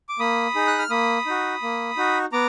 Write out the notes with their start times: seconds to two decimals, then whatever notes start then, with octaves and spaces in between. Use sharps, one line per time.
0.09 D6
0.19 A#3 B5 D#6
0.55 D#4 G#4
0.67 F#6
0.79 F6
0.90 A#3 B5 D#6
1.26 D#4 F#4
1.62 A#3
1.97 D#4 F#4
2.33 B3 A#5 D6